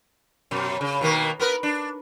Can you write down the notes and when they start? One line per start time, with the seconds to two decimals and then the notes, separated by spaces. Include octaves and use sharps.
0.51 F#2 B2
0.81 C#3
1.01 B2 D#3 A#3
1.39 B3 A#4 B4
1.63 D4